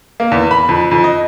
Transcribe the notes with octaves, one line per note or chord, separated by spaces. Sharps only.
A#3
E2
B5
F2
F2
D#5